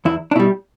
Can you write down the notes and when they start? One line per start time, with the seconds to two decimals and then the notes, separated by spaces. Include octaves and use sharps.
0.05 E2 E4
0.31 D4
0.36 B2 E4
0.40 G3